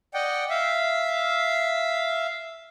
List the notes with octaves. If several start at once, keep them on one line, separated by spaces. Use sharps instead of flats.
D5 D#5 F#5 G5
E5 F5